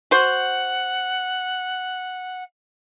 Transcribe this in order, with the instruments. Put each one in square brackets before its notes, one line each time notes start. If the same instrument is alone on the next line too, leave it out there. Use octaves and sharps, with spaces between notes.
[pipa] F#4 C5 [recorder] F#5